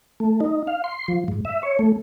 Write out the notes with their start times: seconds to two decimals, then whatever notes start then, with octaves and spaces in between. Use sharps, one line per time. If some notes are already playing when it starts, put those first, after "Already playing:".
0.20 A3
0.41 D#4
0.67 F5
0.84 C6
1.08 F3
1.28 G#2
1.45 E5
1.63 C#5
1.79 A3